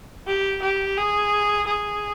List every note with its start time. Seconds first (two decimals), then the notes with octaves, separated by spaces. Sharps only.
0.27 G4
0.62 G4
0.97 G#4
1.67 G#4